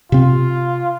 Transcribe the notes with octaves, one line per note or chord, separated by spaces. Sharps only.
C3 C4 F4